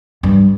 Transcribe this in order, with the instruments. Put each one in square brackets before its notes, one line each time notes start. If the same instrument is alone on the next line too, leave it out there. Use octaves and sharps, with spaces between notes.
[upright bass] G2